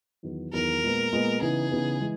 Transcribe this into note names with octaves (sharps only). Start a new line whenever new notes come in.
E2 D#3 F#3 B3
E2 D#3 F#3 B3 A#4
A#2 G#3 B3
A#2 G#3 B3
C#3 E3 B3 D#4 G#4
C#3 E3 B3 D#4
E3 G#3